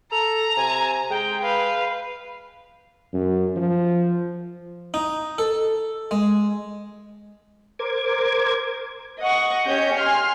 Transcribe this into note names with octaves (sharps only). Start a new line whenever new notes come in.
A4 A#5 F7
C3 G#5
G#3 G5
B4 F5
F#2
F3
D#4
A4
G#3
A#4 C5 D6 G#6
D#5 F#5 C#6
C#4 G4 C#5 D#5 G6
G#5 C6 F6